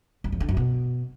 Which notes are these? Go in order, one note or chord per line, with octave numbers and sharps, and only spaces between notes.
G2
F2
D3
F#2
B2